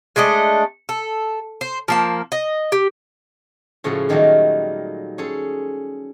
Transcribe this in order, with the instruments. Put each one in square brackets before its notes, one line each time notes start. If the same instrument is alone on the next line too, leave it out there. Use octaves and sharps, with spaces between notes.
[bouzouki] G#3 A3 D4 D#5
A4
C5
F3 A#3 A5
D#5
G4
[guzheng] A2 C#3 F3 F#4 G#4 A4
A#2 D#3 F#3 G3 A3 A#3
C#4 G#4 A4 C5